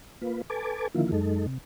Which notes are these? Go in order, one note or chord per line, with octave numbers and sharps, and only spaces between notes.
A#3 F4 B4
A4 B4 G#5 A5 D6
D3 D#3 F3 A#3 E4 F4
F#2 G#3 D#4 A4
C3